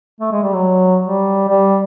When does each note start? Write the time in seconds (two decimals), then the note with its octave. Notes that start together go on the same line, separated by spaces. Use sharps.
0.20 A3
0.32 G#3
0.43 G3
0.54 F#3
1.02 G3
1.48 G3